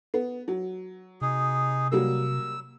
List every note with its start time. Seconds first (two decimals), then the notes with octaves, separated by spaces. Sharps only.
0.14 B3
0.48 F#3
1.21 C3 D#4 G#4
1.92 F#3 G3 A#3 E6